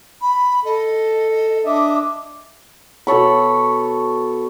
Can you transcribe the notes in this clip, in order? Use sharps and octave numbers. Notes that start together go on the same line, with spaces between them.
B5
A4 D#5
D4 D#5 E5 D6
B2 A4 C#5 B5